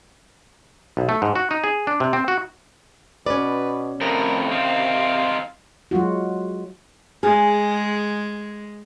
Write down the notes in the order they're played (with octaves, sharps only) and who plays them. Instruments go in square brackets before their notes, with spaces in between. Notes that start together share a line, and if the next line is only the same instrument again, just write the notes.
[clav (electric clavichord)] B1
A3
G#2
F#4
D#4
G#4
D4
C3
C4
F#4
[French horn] B2 [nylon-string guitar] C#4 D5 [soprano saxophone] B4
[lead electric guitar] F2 A2 [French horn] C3 [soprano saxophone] A#4
[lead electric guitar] D#3 C4 [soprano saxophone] F5
[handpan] F#3 G#3 F4 F#4
[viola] G#3 [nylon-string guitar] G#4